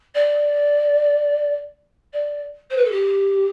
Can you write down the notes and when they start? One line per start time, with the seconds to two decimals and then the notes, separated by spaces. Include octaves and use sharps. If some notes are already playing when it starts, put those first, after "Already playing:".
0.14 D5
2.13 D5
2.70 C5
2.76 B4
2.84 A4
2.91 G4